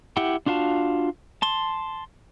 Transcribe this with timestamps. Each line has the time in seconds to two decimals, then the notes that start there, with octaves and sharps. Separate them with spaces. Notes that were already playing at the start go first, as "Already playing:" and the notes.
0.17 E4 G4 F#5 G5
0.46 D4 F4 F#4 F5 A5
1.42 A5 C6